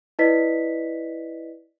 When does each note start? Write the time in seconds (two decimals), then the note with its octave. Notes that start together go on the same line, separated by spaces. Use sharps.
0.19 E4 B4 D5 D#5 B6